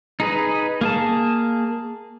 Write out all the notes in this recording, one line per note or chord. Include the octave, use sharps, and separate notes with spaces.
D#4 G#4 B4
A#3 G#4 A5